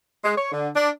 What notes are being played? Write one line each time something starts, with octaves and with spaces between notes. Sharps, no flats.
G#3
C#5
D3
D4